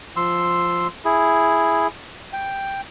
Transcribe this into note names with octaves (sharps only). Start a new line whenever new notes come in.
F3 C6 E6
E4 G#4
G5